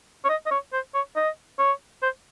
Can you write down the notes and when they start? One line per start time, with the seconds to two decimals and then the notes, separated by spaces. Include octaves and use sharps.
0.25 C#5
0.29 D#5
0.46 D#5
0.51 C#5
0.73 C5
0.94 C#5
1.16 D#5
1.59 C#5
2.02 C5